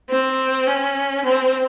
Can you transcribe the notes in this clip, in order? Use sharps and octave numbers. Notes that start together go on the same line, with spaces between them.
C4
C#4
C4